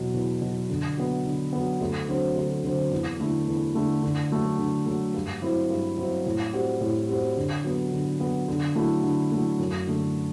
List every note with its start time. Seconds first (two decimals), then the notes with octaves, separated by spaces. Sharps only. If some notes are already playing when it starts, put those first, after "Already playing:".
Already playing: E2 B2 F#3
0.14 E2
0.42 B2 F#3
0.70 D3
0.97 F#3 B3
1.25 D3
1.53 F#3 B3
1.81 D2
2.09 D3 F#3 C4
2.36 D2
2.63 D3 F#3 C4
2.92 E2
3.20 D3 A3 E4
3.48 E2
3.75 D3 A3 E4
4.03 D3
4.31 F#3 A3
4.59 D3
4.86 F#3 A3
5.14 G2
5.42 F#3 C4 E4
5.70 G2
5.97 F#3 C4 E4
6.26 A2
6.53 G3 C4 F#4
6.81 A2
7.09 G3 C4 F#4
7.36 D3
7.64 F#3 B3
7.92 D3
8.20 F#3 B3
8.48 D3
8.75 F#3 A3 E4
9.04 D3
9.31 F#3 A3 E4
9.59 F#2
9.87 D3 A3